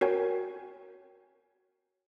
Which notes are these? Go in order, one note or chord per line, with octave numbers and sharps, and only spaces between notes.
F#4 A#4 C#5 G5 G#5